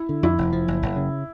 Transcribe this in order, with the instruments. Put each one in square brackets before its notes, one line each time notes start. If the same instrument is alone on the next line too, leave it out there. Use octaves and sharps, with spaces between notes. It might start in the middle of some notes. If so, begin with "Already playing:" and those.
Already playing: [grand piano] E4
[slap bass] D3
[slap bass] F2 [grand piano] E4
[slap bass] F1
F3
F#1
F#1
C#3